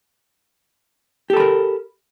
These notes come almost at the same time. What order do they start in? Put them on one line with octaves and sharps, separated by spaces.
G4 A4 B5 A#4